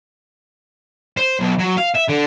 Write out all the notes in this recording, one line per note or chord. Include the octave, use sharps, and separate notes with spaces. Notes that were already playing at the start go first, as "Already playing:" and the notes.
C5
B1
F#3
F5
E5
D3